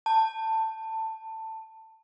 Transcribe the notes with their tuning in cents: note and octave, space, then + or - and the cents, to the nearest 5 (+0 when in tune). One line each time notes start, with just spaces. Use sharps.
A5 +15